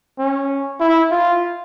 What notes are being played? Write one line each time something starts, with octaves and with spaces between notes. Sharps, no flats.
C#4
E4
F4